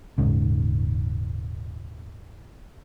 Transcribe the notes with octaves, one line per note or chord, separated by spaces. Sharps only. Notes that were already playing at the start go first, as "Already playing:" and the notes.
D#1 A#1 G#2 C#3